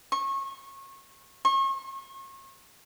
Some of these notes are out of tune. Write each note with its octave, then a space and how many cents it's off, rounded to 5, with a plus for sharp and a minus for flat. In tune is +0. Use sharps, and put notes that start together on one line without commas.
C#6 -30
C#6 -40